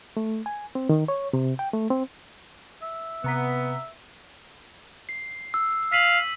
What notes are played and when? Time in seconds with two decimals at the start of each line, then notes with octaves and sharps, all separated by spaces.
0.17 A3
0.46 G#5
0.75 C4
0.89 D#3
1.08 C#5
1.33 C3
1.59 G5
1.73 A3
1.90 C4
2.83 E5
3.24 C3 B3 A#5 B6
5.09 C7
5.54 E6
5.92 F5 B6 D#7 F#7